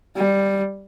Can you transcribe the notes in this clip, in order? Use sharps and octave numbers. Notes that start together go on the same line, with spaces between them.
G3